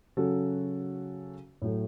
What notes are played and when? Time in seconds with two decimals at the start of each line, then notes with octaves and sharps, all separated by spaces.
0.17 C#3 F#3 C#4 F#4 A4
1.62 A2 F#3 A3